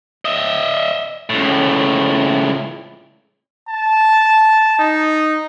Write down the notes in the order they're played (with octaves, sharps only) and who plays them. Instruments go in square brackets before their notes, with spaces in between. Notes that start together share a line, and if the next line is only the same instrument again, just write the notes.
[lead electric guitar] D#5 E5
C#2 A2
[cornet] A5
D#4